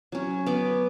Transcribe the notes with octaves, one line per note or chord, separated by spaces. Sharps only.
F#3 C#4
B3 D6